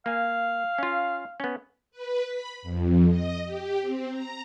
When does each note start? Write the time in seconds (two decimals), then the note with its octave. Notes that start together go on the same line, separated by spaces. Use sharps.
0.06 A#3 F5 G#5
0.78 C#4 F4
1.40 B3 C#4
1.91 B4
2.27 B5
2.62 F2
3.08 D#5
3.44 G4
3.81 C4
4.10 A#5